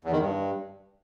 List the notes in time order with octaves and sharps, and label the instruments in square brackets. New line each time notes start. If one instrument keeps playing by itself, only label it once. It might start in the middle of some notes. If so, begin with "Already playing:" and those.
[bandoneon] E2
D#3
G2